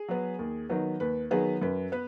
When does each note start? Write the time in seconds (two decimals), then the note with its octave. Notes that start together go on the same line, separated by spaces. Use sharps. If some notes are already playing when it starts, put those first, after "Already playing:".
Already playing: G#4
0.09 F#3 B3
0.39 D#2
0.70 D#3 F#3 B3
1.00 D#2 B4
1.31 D#3 F#3 B3 G#4
1.61 F#2 B4
1.92 B3 B4